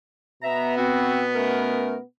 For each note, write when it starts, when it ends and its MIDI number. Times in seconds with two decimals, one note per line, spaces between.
0.43 2.02 47
0.43 2.02 59
0.43 0.75 76
0.43 0.75 82
0.77 1.22 60
0.77 1.22 66
1.35 1.96 57
1.35 1.96 61
1.35 1.96 70